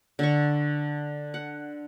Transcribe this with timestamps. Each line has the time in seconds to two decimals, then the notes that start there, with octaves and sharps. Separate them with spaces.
0.19 D3 C#6
1.34 F#5